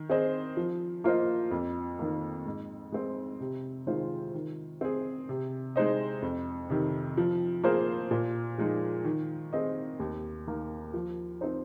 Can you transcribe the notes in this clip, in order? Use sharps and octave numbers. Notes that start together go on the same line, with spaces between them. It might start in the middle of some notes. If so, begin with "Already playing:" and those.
Already playing: D#3
C4 G#4 C5 D#5
F3
A#3 F4 C5 D#5
F2
D#3 A#3
G#2
G#3 C4
C3
D#3 G#3 F4 C5
D#3
C4 G#4
C3
G#3 D#4 C5 D#5
F2
C3 D#3
F3
A#3 F4 G#4 C5
A#2
F3 G#3 D#4
D#3
C4 G#4 D#5
D#2
D#3 A#3
F3
C4 D#4 C5